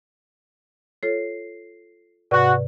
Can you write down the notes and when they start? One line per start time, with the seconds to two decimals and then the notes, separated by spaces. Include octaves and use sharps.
1.03 F4 A4 C#5 C7
2.31 G#2 C3 F#4 B4 D5